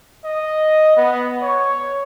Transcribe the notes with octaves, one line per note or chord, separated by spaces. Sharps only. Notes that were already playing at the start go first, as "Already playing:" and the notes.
D#5
B3
C#5